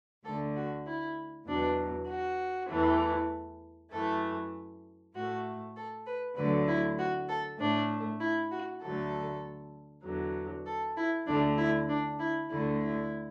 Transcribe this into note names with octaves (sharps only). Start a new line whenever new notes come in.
D2 D3 A3 A4
F#4
E4
E2 B2 F#3 D4
F#4
E2 E3 A3
F#2 E3 A3 A4
A2 A3 F#4
A4
B4
D2 D3 F#3 A3 B4
E4
F#4
A4
A2 A3 D4
E4
F#4
D2 D3 F#3 A3 A4
E2 D3 F#3
A4
E4
D2 D3 A3 D4
E4
D4
E4
D2 D3 A3 E4
E4